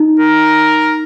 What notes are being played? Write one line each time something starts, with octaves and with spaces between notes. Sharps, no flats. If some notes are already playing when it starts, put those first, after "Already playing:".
Already playing: D#4
A#4